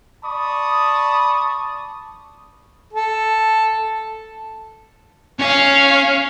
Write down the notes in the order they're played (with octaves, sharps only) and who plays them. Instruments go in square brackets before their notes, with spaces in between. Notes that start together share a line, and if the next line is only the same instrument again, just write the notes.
[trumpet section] D5 A5 B5 C#6 D#6
[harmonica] A4
[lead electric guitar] C#4 G#5 [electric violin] C#5 F5